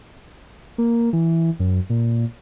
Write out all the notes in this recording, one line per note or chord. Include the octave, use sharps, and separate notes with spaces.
A#3
E3
F#2
A#2